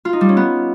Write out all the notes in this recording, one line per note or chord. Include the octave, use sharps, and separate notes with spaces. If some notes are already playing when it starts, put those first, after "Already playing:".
F4
D#4
G3
C#4
B3